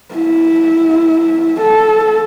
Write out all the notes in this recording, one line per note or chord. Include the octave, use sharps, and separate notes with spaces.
E4
A4